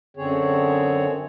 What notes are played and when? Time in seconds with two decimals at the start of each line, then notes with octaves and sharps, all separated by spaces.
0.17 F#2 D3 C4 G#4 C#5